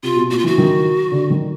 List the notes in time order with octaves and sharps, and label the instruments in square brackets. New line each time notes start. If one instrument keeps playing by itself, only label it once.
[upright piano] C3 [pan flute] F4
[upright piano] B2
[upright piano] A#2 [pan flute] F#4
[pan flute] F4
[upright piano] E3 [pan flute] F#4
[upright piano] D#3
D3
D#3